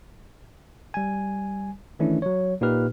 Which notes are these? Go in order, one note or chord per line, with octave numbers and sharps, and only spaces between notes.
G3 G#5
D#3 E3 A3 C#4 D4 E4
F#3 C#5
A#2 A#3 D#4 G4 B4 F6